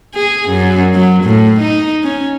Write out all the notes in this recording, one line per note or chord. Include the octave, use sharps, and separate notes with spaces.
G#4
F#2
F#3
A2
D#4
C#4